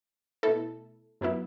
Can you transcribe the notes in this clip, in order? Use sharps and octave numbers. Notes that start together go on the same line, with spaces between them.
B2 A3 E4 A4
F#2 F#3 B3 E4